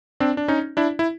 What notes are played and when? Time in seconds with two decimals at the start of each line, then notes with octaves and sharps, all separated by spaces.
0.20 C4 D4
0.37 D4
0.48 C#4 D#4
0.77 D4 E4
0.99 E4